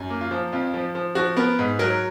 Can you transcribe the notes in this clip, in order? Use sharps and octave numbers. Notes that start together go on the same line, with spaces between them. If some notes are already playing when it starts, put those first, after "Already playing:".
Already playing: F#2
A#3
F4
F3
F2 F4
F3
F3
F3 F#4
B3 A#4
G#2
F#3 A#4